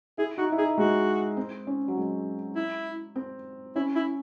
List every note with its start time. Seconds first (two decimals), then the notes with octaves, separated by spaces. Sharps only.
0.18 E4 G#4
0.37 D#4 F#4
0.52 E4
0.58 D#4 G#4
0.78 G#3 F#4
1.37 C4
1.67 C#4
1.88 F#3
1.97 G#3
2.56 E4
3.16 C4
3.76 C#4 E4
3.96 E4